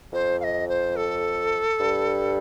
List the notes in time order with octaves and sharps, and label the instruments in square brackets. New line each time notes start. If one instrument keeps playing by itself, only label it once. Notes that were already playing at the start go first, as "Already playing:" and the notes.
[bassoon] F2 [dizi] C5
[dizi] F5
D#5
C5
A4
[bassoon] G2